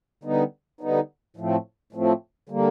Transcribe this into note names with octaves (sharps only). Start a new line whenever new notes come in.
D3 G3 B3 D#4
D3 G3 B3 D#4
A2 F3 A3 C4
A2 F3 A3 C4
D3 G3 A#3